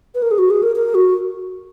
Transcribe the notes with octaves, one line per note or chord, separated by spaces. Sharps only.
B4
A#4
G#4
F#4
G#4
A#4
A#4
F#4